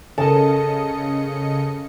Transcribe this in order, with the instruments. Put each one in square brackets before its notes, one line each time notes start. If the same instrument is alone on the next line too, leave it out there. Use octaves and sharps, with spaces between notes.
[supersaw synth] C#3 D#5 C#7 [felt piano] A4 A#4 [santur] A5